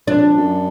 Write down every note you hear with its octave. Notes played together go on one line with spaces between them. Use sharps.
F2 D4
F2
F#2